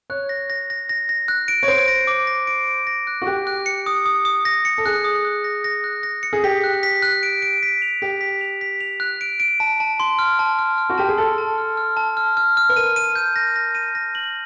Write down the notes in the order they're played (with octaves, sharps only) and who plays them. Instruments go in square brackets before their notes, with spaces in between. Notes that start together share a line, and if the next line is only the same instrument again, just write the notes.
[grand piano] C#5 [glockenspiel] F#6
[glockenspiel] A#6
A#6
A#6
A#6
A#6
F#6
D7
[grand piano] C#5
[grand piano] C5 [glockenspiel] D7
[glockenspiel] A#6
D6
A#6
D7
D7
A#6
F#6
[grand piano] F#4
[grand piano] G4 [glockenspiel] F#6
[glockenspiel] F#6
C#7
D#6
D#6
D#6
A#6
C#7
[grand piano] A4
[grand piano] G#4 [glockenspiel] F#6
[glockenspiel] D#6
F#6
A#6
A#6
F#6
A#6
C#7
[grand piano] G#4
[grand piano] G4 [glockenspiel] B6
[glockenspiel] F#6
B6
F#6
D7
D7
B6
F7
[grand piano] G4 [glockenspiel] B6
[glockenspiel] B6
F7
B6
F7
F#6
D7
D7
A5
A5
C6
F6
A5
F6
F6
[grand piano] F#4
[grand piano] G4 [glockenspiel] A5
[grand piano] G#4
[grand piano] A4 [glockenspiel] C6
[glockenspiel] A5
F6
F6
A5
F6
F6
F6
[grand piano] B4
[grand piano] A#4 [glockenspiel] D#7
[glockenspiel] D#7
G6
A#6
A#6
D#7
A#6
F#7